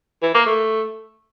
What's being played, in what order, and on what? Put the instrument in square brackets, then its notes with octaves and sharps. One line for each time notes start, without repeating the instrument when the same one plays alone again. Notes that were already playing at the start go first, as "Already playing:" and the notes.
[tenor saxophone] E3
A#3
A3